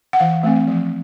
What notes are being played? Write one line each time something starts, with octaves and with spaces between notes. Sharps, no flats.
F#5
E3 F5
A3 C4
F3